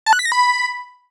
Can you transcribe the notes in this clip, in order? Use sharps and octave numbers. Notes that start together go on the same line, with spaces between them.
A5
F#6
B6
A#6
B5